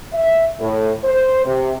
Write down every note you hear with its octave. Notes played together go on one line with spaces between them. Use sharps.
E5
A2
C5
C3